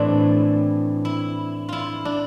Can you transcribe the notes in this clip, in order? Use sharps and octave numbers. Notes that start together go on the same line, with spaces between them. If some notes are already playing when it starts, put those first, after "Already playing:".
Already playing: A2 E3 C4 D4
E4
E4 F4
D4